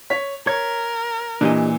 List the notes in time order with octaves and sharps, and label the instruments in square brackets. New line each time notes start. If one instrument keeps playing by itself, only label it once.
[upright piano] C#5 B6
[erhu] A#4 [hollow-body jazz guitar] C#5 [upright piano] G#6
[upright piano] A#2 E3 [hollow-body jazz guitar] D4 G4 D#5